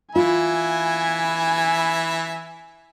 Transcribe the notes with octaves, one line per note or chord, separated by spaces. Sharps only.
E3 F4 E5 G#5 B5